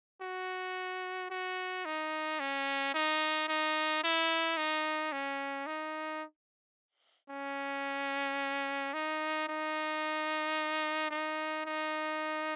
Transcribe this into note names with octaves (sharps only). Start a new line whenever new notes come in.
F#4
F#4
D#4
C#4
D#4
D#4
E4
D#4
C#4
D#4
C#4
D#4
D#4
D#4
D#4